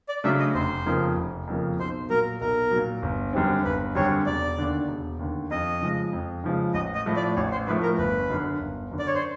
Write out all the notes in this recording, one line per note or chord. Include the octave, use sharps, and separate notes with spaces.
D5
C#3 F#3 A3 D4 E5
D#5
F1 C5
F2 C#3 F3 A#3
F1
F2 C#3 F3 A#3
B1 C5
A#2 F#3 A#4
B1 A#4
A#2 F#3
G1
F#2 D3 G3 C4
G1 B4
F#2 D3 G3 C4 C#5
E1 D5
D#2 D3
E1
D#2 D3
F2 D#5
C#3 F3 G#3
F2
C#3 F3 G#3
A1 D#5
D#5
A2 F3 A3
D5
A1 C#5
C5
A2 F3 A3 B4
A#4
G1 B4
F#2 D3
G1
F#2 D3
D5
C#5
C5